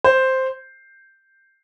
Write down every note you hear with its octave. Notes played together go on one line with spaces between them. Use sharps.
C5